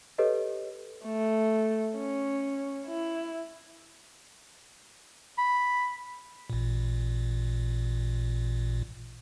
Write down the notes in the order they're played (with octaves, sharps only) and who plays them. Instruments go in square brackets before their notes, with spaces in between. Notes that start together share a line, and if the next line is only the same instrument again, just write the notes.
[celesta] G4 A4 B4 C#5 D#5
[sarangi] A3
C#4
E4
[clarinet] B5
[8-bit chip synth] A1 A#2